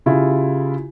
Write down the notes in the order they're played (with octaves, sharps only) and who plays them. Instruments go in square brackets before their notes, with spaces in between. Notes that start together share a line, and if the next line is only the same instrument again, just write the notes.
[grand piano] C#3 E4 F4 G4